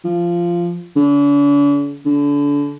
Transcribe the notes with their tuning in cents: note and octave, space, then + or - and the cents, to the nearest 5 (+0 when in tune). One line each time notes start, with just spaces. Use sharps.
F3 -15
D3 -45
D3 -30